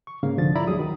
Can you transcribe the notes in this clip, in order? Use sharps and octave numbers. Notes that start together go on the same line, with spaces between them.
C#6
G#2 C#3 A#3 F5
C2 D3 F3 A6
G#2 E4 D5 A#5 B5
D#2 F#3 G#4 D#6
D#3